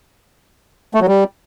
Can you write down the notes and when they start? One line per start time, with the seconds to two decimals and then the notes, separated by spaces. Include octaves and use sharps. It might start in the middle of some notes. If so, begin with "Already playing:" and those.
0.94 A3
1.01 F#3
1.08 G3